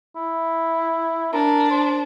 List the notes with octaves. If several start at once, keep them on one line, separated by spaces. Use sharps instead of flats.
E4
D4 A#4
C5